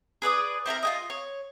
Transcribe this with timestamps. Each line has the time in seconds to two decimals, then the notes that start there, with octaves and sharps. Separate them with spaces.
0.22 G#4 B4 D5 D#6
0.66 C4 E4 A4 A#4
0.83 F4 G#4 D#5
1.10 C#5